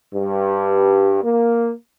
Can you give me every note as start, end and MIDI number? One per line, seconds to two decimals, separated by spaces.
0.14 1.19 43
1.23 1.71 58